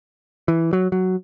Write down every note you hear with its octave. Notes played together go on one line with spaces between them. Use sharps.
E3
F#3
F#3